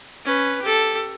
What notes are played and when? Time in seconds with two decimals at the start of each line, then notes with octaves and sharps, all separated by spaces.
0.25 C#4 B4
0.62 G4 A4